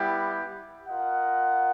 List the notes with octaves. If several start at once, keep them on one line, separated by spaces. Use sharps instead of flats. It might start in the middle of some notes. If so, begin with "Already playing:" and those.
Already playing: G3 B3 E4 G4
F4 A#4 D#5 F#5